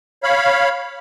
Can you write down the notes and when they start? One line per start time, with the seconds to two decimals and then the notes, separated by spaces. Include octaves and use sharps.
0.23 C#5 F5 B5